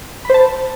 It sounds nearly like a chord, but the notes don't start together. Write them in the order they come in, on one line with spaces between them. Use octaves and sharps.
B5 C5 A5